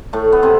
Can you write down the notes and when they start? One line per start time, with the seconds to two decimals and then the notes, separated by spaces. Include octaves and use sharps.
0.13 A2 A3
0.32 B3
0.43 C3 C4